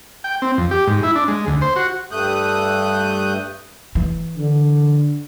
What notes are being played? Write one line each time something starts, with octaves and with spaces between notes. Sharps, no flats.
G5
C4
F2
G4
G#2
E4
D4
G#3
D2
C5
F#4
G2 A3 D#6 F#6 G6
E3
D3